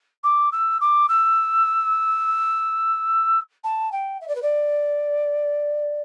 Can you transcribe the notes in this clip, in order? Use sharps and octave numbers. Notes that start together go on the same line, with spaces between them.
D6
E6
D6
E6
A5
G5
E5
D5
B4
D5